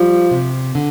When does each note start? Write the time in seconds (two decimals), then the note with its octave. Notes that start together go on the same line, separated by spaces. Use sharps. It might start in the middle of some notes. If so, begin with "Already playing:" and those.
Already playing: F3 G3
0.31 C3
0.75 D3